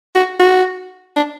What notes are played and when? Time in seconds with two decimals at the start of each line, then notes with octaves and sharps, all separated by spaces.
0.15 F#4
0.40 F#4
1.16 D4